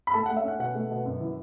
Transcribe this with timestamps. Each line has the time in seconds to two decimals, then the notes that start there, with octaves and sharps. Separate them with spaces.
0.07 B5
0.13 A3 A4 A5
0.26 F#5
0.30 A3
0.37 E5
0.44 C#4 F#5
0.59 B2 F#5
0.75 A3
0.91 B2
1.06 F#2
1.20 E3